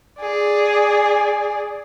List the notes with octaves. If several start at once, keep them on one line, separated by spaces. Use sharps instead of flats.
G#4 D5